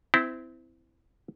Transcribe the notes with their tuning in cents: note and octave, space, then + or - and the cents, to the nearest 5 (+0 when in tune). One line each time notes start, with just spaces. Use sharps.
C4 -25 E4 +0